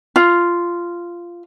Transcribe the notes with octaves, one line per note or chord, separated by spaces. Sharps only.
F4